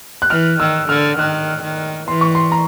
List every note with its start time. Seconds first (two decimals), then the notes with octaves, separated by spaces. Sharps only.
0.22 F#6
0.30 E3 F6
0.60 D#3 E6
0.89 D3 F6
1.19 D#3 F#6
1.63 D#3
2.08 E3 C6
2.21 C#6
2.35 C6
2.52 A#5